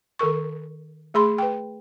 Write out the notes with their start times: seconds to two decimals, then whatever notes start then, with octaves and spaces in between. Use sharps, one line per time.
0.19 D#3 A4 A#4 C#6
1.14 A3 G#4 B5 C6
1.38 B4 G5